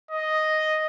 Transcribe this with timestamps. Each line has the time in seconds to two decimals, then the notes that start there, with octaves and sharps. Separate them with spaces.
0.11 D#5